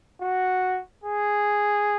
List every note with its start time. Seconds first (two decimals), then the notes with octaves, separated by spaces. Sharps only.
0.21 F#4
1.04 G#4